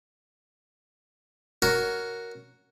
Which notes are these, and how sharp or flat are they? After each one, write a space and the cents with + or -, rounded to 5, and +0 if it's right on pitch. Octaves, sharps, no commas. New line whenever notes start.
F#4 +0 A#4 +0 C#5 +20